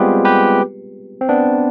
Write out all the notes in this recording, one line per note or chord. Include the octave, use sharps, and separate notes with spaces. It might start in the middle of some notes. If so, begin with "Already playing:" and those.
Already playing: G3 G#3 B3 C4 F4 G4 G#4 B4
G4 B4
C4
B3 D4